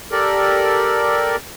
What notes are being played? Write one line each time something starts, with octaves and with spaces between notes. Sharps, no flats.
G4 A4 A#4 D5